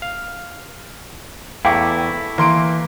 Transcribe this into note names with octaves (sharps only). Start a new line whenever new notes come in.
F5
E2 A3 E4 F5 G5 A#5 D6
E3 A#3 C6 D7